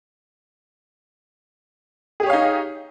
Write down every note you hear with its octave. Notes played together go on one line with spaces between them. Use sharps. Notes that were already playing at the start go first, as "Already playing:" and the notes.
D#4 G4 G#4 C#5 F5